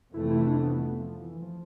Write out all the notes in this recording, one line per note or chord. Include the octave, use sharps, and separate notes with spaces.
F2 C3 E3 A3 E4
E4
D4
B3
F3
E3
F3